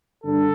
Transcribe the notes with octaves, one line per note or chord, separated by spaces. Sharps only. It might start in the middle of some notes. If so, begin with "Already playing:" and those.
G2 D3 A4